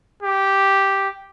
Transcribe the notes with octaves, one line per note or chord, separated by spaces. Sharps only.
G4